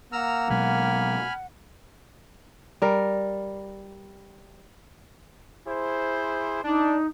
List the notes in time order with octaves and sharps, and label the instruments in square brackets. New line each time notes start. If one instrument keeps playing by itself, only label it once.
[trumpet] A#3 [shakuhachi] F#5 [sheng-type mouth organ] A#5 E6 F6
[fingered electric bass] B2 F#3 G#3 [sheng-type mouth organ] G#5 B5 F6
[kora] G3 A#4
[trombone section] E4 G#4 C5
[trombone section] D4 [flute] D#4